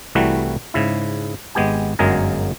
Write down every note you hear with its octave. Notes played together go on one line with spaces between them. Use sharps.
C2 E3 G3 A3 F#4
G#2 C#3 E4
G#1 G#3 B3 G4 G#5
G1 F#2 F#3 G#3 G#4 A#4